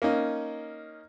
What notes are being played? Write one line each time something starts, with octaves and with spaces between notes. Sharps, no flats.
A#3 C#4 D#4